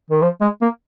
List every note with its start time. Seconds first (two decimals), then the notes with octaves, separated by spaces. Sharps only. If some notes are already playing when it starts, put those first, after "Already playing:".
0.10 D#3
0.22 F3
0.41 G#3
0.61 A#3